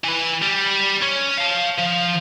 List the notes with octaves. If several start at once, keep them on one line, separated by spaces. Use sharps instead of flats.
E3 B4
G3
C#4
F5 A5
F3